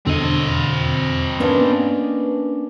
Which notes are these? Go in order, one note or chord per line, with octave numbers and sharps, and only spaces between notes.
E2 B2 D3 C4 D#5
A#3 B3 C#4 D4 B4